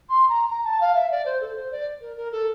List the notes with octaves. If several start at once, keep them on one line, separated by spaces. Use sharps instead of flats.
C6
A#5
A#5
A5
F5
E5
D5
C5
A4
C5
D5
A#4
A#4
A4